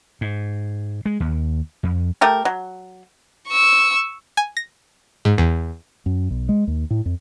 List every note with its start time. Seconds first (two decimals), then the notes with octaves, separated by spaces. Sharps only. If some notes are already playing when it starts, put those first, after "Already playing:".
0.21 G#2
1.06 G#3
1.20 D#2
1.83 F2
2.21 A3 G4 A#4
2.45 F#3
3.48 C#6 E6
4.37 G#5
4.57 A#6
5.25 G#2
5.38 E2
6.06 F#2
6.31 B1
6.49 G#3
6.67 D#2
6.91 A2
7.06 F2